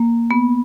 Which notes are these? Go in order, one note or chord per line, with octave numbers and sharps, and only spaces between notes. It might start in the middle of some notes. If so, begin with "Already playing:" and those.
Already playing: A#3
B3